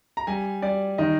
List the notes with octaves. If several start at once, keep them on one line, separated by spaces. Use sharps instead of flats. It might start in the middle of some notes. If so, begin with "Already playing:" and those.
A#5
G3 G#5
G3 D5
D#3 D#5